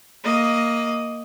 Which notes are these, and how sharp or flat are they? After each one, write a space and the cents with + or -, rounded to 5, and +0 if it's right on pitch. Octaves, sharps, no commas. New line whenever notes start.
A#3 +0 D#5 +5